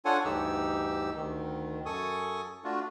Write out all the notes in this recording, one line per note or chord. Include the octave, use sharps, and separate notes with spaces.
D4 F4 A4 C#5 F#5 G#5
D2 G2 E3 D#4 G4 E6
D2 D#3
F#2 A4 G#5 C#6 D#6
A3 D4 F4 F#4